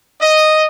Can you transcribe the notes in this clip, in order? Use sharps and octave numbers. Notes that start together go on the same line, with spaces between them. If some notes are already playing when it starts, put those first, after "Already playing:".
D#5